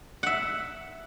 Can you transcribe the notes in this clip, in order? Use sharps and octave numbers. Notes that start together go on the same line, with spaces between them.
E5 F#5